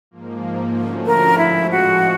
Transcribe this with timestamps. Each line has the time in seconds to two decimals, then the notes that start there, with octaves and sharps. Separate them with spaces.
0.11 G#2 F3 A#3
0.74 D3 F3 A3 C#4 F#4
1.07 A#4
1.38 A2 F3 G#3 E4
1.71 F#4